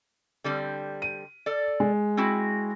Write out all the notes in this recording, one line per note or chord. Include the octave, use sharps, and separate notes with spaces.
D3 G3 C4
D#7
A4 D5
G#3
C4 E4 F#4